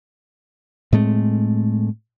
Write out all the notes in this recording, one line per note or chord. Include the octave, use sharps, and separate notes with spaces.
A2 G#3 A3 C4